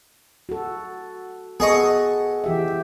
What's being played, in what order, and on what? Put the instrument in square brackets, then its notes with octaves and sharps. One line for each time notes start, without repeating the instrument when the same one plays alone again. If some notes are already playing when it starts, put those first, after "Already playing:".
[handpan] F#4 A4
[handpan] B3 A4 [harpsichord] G#4 D#5 C#6
[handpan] E3 G4 E5